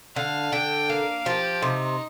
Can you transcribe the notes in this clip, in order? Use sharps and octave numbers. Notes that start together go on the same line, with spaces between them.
D3 F5
D3 G5
A#3 F5
F3 G4
C3 D#4